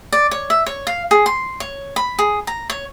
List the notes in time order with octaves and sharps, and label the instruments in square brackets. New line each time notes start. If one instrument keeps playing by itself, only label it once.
[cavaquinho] D5
C#5
E5
C#5
F5
G#4
C6
C#5
B5
G#4
A#5
C#5